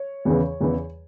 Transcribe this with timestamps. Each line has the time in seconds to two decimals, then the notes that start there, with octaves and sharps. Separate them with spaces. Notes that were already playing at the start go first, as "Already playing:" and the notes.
Already playing: C#5
0.25 E2 C#3 E3
0.61 E2 C#3 E3